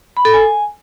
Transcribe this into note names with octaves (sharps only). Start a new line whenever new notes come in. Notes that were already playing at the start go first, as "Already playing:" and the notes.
B5
A4
G#5